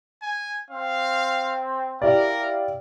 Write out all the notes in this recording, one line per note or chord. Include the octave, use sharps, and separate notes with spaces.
G#5
C4 F5
E4 G4 A#4 D5 F5